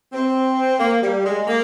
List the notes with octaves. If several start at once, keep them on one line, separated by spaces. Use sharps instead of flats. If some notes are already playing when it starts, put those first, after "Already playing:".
C4
A#3
G3
G#3
A#3